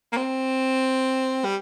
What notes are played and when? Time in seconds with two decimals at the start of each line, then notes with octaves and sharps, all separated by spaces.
0.12 A#3
0.17 C4
1.44 G3